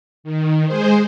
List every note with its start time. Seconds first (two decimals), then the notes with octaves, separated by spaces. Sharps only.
0.24 D#3
0.66 G#3 G#4 C5